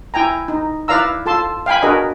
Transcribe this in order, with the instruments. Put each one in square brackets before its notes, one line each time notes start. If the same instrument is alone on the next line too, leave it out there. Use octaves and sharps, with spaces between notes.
[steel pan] E4 G5 G#5 A#5
D#4
E4 B4 D5 F5 A#5 E6
F4 A4 A5 C6
F5 G5 G#5 B5
D4 F#4 G#4 A#4 B4 D#5